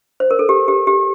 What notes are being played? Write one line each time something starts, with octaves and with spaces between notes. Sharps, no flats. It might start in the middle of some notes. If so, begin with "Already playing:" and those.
C5
A#4
A4
G4
G4
G4